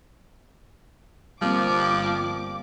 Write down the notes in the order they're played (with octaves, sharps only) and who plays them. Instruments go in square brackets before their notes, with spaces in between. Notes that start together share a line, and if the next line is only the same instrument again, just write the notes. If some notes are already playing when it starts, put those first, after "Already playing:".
[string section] G1 D6 [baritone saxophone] F3 [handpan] G3 A#3 C4